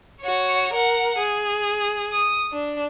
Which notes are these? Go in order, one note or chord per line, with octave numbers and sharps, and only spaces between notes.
F#4 C#5
A#4 F#5
G#4
D#6
D4